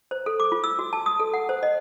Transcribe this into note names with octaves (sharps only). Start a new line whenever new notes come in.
C5
A4
D6
F4
E6
F#4
A5
D#6
A4
F#5
C5
D#5